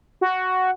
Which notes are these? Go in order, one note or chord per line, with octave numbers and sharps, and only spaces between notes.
F#4